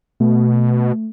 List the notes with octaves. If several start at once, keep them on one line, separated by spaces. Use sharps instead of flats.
B2 A3